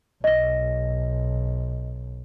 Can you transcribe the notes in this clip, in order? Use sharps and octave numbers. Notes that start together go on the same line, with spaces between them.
B1 D#5 A#6